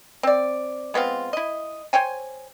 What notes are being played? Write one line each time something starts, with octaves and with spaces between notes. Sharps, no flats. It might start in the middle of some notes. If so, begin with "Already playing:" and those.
C4 D5
G#3 B3 C4 F4
E4 D#5
C5 C#5 G5 G#5